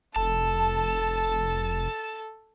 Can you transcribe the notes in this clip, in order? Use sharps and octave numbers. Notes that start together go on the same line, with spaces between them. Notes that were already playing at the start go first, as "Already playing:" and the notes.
F1 A4 A5